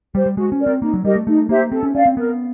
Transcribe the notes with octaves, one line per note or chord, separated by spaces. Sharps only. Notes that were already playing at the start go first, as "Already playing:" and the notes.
G3 G4 C5
G3
G#3 F#4
C#4
A#4 D5
C4
A#3 D#4
F#3
G3 G4 A#4 D#5
A3
A3 D#4
A#3 G4 C5 E5
C4 A4
C#4
C#4 D5 F5
C4
B3 A#4